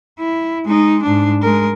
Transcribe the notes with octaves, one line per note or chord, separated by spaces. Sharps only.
E4
G#3 D#4
G#2 D4
G#3 A#4